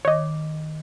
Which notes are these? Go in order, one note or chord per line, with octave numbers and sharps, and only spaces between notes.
D#3 C#5 D#5 D6